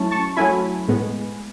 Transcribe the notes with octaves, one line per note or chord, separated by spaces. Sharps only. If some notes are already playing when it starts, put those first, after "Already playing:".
Already playing: F#3 A3 C#4 E4 A5 C#6
A5 C#6
F#3 A3 C#4 E4 G#5 B5
A2 G#3 B3